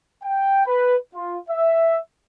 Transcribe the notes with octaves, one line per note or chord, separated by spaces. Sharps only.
G5
B4
F4
E5